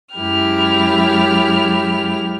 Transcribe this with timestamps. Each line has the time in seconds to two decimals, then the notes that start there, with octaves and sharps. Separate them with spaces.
0.15 F#2 G#3 E4 G4 F6